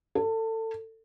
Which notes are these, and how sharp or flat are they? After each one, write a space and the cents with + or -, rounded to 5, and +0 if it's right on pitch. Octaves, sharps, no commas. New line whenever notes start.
A4 +25